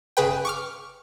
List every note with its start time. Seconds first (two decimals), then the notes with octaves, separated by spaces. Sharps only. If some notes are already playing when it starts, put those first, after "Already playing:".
0.17 G1 C#3 G#4 B4 G5
0.45 C#6 D6 F6